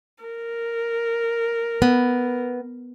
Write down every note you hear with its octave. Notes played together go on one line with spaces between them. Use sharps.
A#4
B3